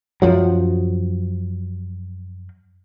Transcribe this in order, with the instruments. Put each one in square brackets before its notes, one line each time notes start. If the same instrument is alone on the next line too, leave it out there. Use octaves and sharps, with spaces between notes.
[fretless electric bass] F#2 F3 F#3